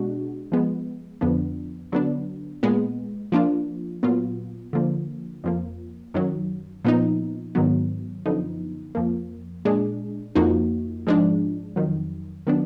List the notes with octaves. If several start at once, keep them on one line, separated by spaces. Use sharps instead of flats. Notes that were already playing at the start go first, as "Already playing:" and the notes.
Already playing: B2 G#3 D4 F#4
F3 G#3 B3
F2 D3 F3 B3 D4
D3 F#3 B3 D4
A#2 G#3 B3
F3 A#3 D4 F4
A#2 F#3 B3 F4
D3 F3 A#3
F2 F3 A#3
F#2 D#3 F#3
A#2 F3 B3 D#4
G#2 D#3 F#3 B3
F#2 D3 F3 B3 D#4
F2 F3 A#3
A#2 G#3 D4 G#4
F2 F3 A#3 D#4 F#4
G#2 F3 G#3 D4
F2 D#3 F#3
D#3 F#3 B3 D4